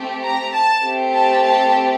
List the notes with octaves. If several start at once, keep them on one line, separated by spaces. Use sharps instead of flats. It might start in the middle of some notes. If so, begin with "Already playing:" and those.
Already playing: A3 C4 G4
A#5
A5
A3 C4 G4
A5
A5